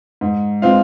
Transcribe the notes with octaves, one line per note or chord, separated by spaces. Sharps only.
G#2
F3 G#3 C4 F4 F5